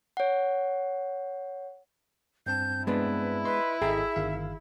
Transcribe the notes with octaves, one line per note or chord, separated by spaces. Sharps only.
C#5 F#5
G2 C4 A5 G6
G#3 B3 D4 E4 B4
B4 D#5 C6
G#1 G#4 A4 D#5 E5 G5 A#5
G1 D#3 F5